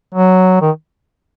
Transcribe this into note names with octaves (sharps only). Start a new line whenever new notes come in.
F#3
D#3